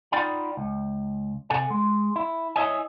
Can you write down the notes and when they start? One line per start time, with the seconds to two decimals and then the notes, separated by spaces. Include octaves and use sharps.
0.12 D#4 F4 D5 F#5 G5 B5
0.57 C#2
1.50 C3 A4 F#5 G#5
1.70 G#3
2.16 E4
2.56 E4 C#5 D#5 E5 G#5